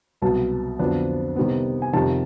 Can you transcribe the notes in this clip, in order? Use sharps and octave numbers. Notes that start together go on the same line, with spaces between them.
C2 B2 F#3 B3 A5
F2 D3 F#3 B3 D4
C3 D#3 G3 B3
G#5
F2 C3 D#3 G3 A5